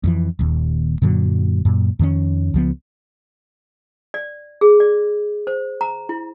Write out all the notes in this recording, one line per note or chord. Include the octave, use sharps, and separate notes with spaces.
F2 D#3 E3
D#1 D#2
F#2 A#2 D3 F#3
F#2 A#2
F2 D#3 B3 C#4
C#2 F3 B3
D5
G#4
D5
C5
A#5
E4